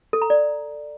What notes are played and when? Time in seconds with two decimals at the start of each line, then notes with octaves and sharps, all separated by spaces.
0.13 A4
0.22 A#5
0.30 D5